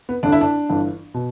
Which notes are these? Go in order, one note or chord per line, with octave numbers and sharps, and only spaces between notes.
B3
G1 G2 D3 D4
E4
D4
G1 G2 E3
B2